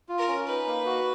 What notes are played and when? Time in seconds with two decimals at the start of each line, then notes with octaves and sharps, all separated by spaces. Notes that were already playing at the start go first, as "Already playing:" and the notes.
0.09 F4
0.18 A#4
0.28 C#4
0.47 D#4 B4
0.67 A#3
0.86 F#4